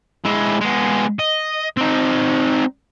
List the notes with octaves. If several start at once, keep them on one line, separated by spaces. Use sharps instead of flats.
G#3 E4
G#3 B3
D#5
C4 D#4